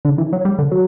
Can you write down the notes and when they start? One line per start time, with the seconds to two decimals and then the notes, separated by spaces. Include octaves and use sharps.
0.05 D3
0.18 E3
0.33 F#3
0.45 G3
0.59 D3
0.71 F#3